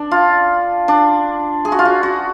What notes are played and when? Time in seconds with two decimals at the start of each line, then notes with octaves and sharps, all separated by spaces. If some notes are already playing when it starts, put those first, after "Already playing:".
Already playing: D4
0.11 F4
0.88 D4
1.65 G#4
1.72 F#4
1.79 F4
1.85 F#4
2.03 F#4